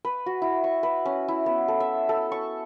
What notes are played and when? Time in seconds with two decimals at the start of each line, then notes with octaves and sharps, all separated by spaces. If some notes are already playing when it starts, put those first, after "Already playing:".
0.05 B4
0.26 F#4
0.42 E4
0.64 C#6
0.83 B4
1.06 C#4
1.28 E4
1.46 B3
1.68 A4
1.80 E5
2.09 A4
2.32 C#6